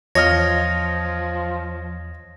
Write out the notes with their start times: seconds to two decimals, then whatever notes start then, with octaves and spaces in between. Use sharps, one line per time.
0.15 E2 F3 C#5 D#5 F6 A#6